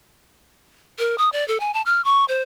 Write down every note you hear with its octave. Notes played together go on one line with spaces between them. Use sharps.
A#4
D#6
D5
A4
G#5
A5
F6
C#6
C5